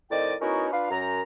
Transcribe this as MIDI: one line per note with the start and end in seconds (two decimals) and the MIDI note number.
0.10 0.34 45
0.10 0.34 51
0.10 0.34 60
0.10 0.34 74
0.10 0.34 75
0.10 0.34 79
0.40 0.68 59
0.40 0.68 61
0.40 0.68 63
0.40 0.68 64
0.40 0.68 66
0.40 0.68 70
0.72 0.90 62
0.72 0.90 65
0.72 0.90 71
0.72 0.90 77
0.91 1.22 42
0.91 1.22 82